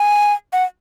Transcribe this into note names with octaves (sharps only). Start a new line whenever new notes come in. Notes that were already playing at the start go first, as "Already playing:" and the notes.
Already playing: G#5
F#5